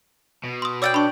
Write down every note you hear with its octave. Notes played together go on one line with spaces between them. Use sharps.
B2
C6 D#6
C#5 D5 F#5 G5 E6 A6
D4 B5 C#6